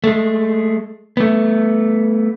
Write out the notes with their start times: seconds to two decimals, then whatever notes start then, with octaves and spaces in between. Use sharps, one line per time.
0.04 G#3 A3
1.17 A3 B3